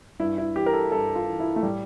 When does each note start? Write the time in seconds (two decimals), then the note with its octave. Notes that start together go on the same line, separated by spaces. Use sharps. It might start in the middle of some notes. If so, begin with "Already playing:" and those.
0.19 G2 E4
0.38 E4
0.55 E3 G4
0.66 A#4
0.73 A4
0.92 G2 A4
1.15 F4
1.28 E3
1.40 E4
1.56 A3
1.63 A2 G3